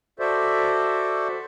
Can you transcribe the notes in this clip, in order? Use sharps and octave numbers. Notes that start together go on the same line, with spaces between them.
F#4 A4 C5 D5 E5